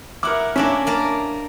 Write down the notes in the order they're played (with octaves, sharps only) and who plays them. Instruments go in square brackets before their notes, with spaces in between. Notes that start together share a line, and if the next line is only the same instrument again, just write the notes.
[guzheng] E4 F#5 [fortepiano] A#4 D6
[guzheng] A#3 D4 E5 [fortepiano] C#4
[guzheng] A#3 A#4 A5